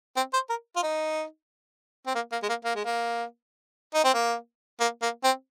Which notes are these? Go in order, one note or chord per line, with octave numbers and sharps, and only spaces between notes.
C4
C5
A#4
F4
D#4
C4
A#3
A#3
G#3
A#3
A#3
G#3
A#3
D#4
C4
A#3
A#3
A#3
C4